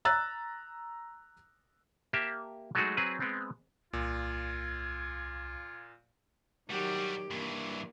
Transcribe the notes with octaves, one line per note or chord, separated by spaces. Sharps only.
A#5 E6 F#6 A6
A#3 G4 E5 A5
F#3 G#3 A3 D#4 F#4 G#4
F#3 C4 G#4 B4
G#3 B3 C4
C2 A#2 F4 G#6
D#3 F#3 G3 F#4 G4
G2 E3 A#3